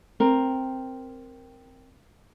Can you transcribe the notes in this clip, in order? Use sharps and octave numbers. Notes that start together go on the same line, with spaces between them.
C4 A#4